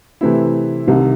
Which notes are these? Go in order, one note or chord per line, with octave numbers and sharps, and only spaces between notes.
C3 E3 A3 C4 E4
C2 C3 D#3